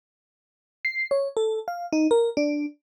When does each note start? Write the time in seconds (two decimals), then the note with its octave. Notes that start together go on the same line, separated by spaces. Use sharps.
0.85 C7
1.11 C#5
1.37 A4
1.68 F5
1.93 D#4
2.11 A#4
2.37 D4